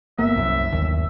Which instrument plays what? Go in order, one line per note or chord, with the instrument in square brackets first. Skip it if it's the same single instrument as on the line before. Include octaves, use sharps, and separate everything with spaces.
[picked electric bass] G1 A#3 B3 [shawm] E5
[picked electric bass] C2 F#2
G1 D#2